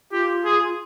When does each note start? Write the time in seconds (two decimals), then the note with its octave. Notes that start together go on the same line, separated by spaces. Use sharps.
0.12 F4 G4
0.45 G#4